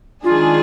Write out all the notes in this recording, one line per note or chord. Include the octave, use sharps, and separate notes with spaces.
D#3 G#3 D4 F4 G#4